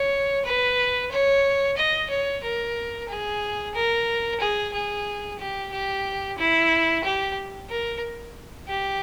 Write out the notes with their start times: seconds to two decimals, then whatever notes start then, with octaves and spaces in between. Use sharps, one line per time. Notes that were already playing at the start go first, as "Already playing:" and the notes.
Already playing: C#5
0.45 B4
1.11 C#5
1.77 D#5
2.10 C#5
2.44 A#4
3.09 G#4
3.74 A#4
4.40 G#4
4.73 G#4
5.39 G4
5.72 G4
6.38 E4
7.04 G4
7.70 A#4
8.68 G4